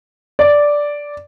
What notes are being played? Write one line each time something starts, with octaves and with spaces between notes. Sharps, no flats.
D5